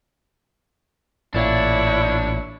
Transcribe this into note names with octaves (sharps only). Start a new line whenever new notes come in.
A1 A#2 D4 E4 C#5